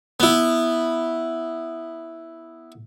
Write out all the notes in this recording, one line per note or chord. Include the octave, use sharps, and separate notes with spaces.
B3 E4